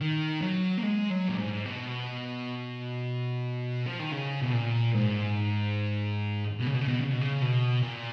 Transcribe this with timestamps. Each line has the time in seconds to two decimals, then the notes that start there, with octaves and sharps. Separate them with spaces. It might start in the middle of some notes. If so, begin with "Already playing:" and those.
0.01 D#3
0.42 F#3
0.78 A#3
0.83 G#3
1.10 F#3
1.29 A#2
1.38 G#2
1.65 B2
3.87 F3
4.00 D#3
4.12 C#3
4.41 B2
4.53 A#2
4.95 G#2
6.60 B2
6.67 C#3
6.74 B2
6.81 C#3
6.88 B2
7.01 C#3
7.11 B2
7.21 C#3
7.42 B2
7.83 A#2